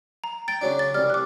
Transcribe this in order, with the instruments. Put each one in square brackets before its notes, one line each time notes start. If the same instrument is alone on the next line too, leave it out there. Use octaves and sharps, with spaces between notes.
[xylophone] A#5
[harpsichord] G5 [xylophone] A6 D7
[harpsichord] C#3 F#3 D4
[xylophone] A6
[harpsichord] C2 G3 [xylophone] F6
[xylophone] D6 F#6